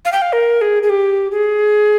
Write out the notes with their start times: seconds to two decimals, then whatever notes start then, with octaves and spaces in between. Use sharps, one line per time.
0.05 F5
0.12 G5
0.22 F5
0.33 A#4
0.61 G#4
0.83 G#4
0.90 G4
1.32 G#4